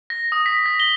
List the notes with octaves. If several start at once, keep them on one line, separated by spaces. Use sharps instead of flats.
A#6
D#6
B6
A#6
G7